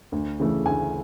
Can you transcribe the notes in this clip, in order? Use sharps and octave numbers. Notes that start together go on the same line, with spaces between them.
D2
C#3 E3 A3
D2 G#5